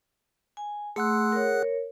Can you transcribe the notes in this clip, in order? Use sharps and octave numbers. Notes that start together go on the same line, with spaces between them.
G#5
A3 G#4 F#5 C6 E6 F#6
A#4 C#5